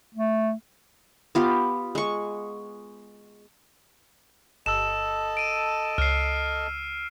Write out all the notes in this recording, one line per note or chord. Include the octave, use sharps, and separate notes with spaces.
A3
B3 F4 G4
G#3 C#6
G1 A4 D#5 A5 E6 E7
D7 D#7
C#2 F6 C7